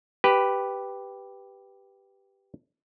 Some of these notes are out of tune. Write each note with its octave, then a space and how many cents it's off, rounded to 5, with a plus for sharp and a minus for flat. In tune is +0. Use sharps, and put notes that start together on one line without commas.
G4 +0 B4 +0